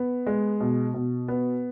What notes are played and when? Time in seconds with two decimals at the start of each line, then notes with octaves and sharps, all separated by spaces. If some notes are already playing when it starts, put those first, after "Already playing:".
Already playing: B3
0.27 G#3
0.60 B2
0.94 B2
1.28 B3